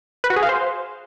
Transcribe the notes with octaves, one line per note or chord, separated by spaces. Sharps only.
B4
F#4
G#4
F5
C5